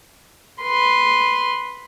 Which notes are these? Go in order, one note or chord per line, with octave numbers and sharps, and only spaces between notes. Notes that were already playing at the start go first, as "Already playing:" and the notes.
B4 C6